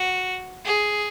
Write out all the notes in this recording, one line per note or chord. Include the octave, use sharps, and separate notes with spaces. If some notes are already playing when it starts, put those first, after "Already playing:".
Already playing: F#4
G#4